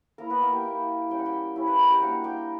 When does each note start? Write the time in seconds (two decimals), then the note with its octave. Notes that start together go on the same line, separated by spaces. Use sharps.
0.18 A#3 E4 A#4 A#5
0.30 B3 B4
0.42 A#3 A#4
0.53 G4 G5
0.65 A#3 E4
1.10 G3 C#4 E4 G5
1.19 F#5
1.26 G4 G5
1.56 G3 C#4 E4
1.67 B4 B5
1.79 A#4 A#5
1.90 G4 G5
2.01 G3 A#3 D4 F#4 F#5
2.24 G4 G5